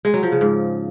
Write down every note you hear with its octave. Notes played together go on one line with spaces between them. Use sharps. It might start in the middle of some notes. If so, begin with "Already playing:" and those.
G#3
F#3
F3
C#3
G#2